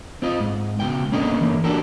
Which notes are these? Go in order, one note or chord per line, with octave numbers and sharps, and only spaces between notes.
C4 F4 D#5
G#2
C#2 B2 G5
A#3 B3 C#4 D4 A4 D#5
E3 A#3
D4 F#4 G4 A4 A#4